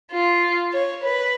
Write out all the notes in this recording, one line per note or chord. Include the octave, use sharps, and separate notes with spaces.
F4
C#5
B4